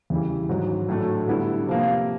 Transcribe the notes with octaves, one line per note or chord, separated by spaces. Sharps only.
E2 C#3 E3 G3
G#2 D#3 F#3
A2 F#3 A3 D4
D3 G3 B3 E4
C3 F3 A#3